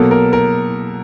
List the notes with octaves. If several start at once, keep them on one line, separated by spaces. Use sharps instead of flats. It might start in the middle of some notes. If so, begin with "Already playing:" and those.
Already playing: B2 F#3 A#3 A4
A#4
A#4